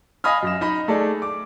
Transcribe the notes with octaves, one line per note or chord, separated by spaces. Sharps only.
D#5 F5 G#5 B5 D#6 F6
F#2 A#6 E7
D#4 D#5 B5
A3 G#4 A4 D5
D6